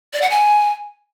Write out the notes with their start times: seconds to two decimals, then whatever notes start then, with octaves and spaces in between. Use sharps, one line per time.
0.13 D5
0.22 F#5
0.30 G#5